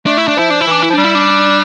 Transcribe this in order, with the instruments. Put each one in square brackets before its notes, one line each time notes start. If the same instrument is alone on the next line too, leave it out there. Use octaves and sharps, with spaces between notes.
[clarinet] A3 [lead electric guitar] D4
[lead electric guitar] E4
D4
[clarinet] F3 [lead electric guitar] E4
[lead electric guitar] D4
E4
[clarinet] E3 [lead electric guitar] D4
[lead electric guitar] E4
[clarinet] F3
[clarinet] G3 [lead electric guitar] D4
[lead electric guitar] E4
D4